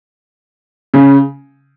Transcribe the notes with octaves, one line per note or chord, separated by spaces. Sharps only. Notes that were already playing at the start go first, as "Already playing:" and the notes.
C#3